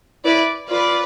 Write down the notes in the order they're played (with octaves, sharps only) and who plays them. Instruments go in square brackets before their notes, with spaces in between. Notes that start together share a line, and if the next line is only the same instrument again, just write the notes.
[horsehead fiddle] E4 [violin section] B4 D5
[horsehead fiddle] F4 [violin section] B4 D5